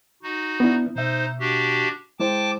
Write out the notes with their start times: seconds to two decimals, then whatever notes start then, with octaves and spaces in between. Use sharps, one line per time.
0.23 D#4 F#4
0.60 B3 D4 E4
0.96 B2 D#4 C5 E5
1.40 D4 F#4 G4
2.20 G#3 E4 C5 G5 A5 D6